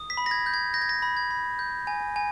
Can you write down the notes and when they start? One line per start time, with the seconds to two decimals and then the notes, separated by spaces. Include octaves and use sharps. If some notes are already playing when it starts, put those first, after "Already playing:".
Already playing: D#6
0.10 B6
0.17 B5
0.26 A#6
0.31 G#6
0.46 G6
0.54 G#6
0.74 G6 A#6
0.82 G#6
0.89 A#6
1.02 B5
1.17 G#6
1.31 B5
1.59 G6
1.87 G#5
2.16 G#5